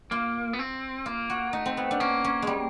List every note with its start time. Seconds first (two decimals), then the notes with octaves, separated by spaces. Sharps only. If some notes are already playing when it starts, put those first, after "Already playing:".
0.11 A#3 F4
0.53 B3
0.59 C4
1.06 A#3 F4
1.30 F#4
1.53 A3 D#4
1.66 C4
1.77 B3
1.91 D4
2.00 A#3 C#4
2.24 C#4
2.42 G3 G#3